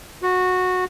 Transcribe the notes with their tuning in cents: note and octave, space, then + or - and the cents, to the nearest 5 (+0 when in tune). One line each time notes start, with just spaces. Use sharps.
F#4 -15